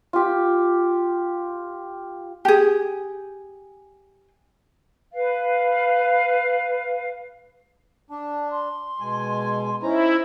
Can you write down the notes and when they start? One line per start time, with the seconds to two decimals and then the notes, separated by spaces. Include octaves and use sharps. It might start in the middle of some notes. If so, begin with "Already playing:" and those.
0.13 F4 G4
2.45 G4 G#4
5.12 B4 F5
8.10 D4 A5
8.51 C6
9.00 B2 G#3 G#5
9.83 C#4 D#4 E4 C5 A#5